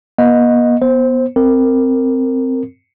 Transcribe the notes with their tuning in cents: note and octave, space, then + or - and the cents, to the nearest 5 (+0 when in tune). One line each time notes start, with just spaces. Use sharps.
B3 -45 D#5 +0
B3 -10 C5 +5
C4 -5 A#4 -20